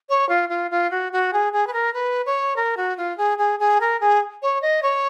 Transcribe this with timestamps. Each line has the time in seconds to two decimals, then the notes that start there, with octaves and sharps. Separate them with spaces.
0.09 C#5
0.29 F4
0.49 F4
0.71 F4
0.91 F#4
1.12 F#4
1.33 G#4
1.53 G#4
1.67 B4
1.73 A#4
1.94 B4
2.26 C#5
2.56 A#4
2.77 F#4
2.97 F4
3.18 G#4
3.38 G#4
3.60 G#4
3.81 A#4
4.00 G#4
4.42 C#5
4.62 D#5
4.83 C#5